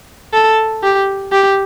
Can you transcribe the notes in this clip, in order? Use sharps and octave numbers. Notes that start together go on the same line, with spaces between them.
A4
G4
G4